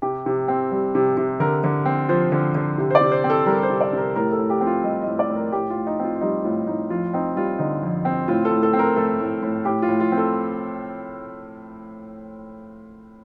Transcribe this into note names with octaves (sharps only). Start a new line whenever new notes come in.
C3 G4
C3
C4
G3
C3
C3
D3 A#4
D3
C4
F3 C5
D3
D3
C3
C5
D5
C3
C5
C4
A4
G3 A#4
C5
C3
D5
C3 A#4
A2 A#4
A4
A2
G4
C4
F4
G3 D#5
D#5
A2
D5
A2
A#4
A2 G4
F4
A2
D#4
C4 F4
F4
G3 D#4
A2 F4
A2 D#4
F2 F4
C4 D#4
G3 F4
D3 D#4
F2
C4
A2 F4
A4
A2
A4
C4
A#4
A3 A4
A2
A2
A2 G4
F4
A2
F4
C4
A4